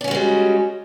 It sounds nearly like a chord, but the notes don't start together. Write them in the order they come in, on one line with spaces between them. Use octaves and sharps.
D4 C#4 F#4 G#3 G3